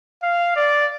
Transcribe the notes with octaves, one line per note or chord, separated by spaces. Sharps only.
F5
D5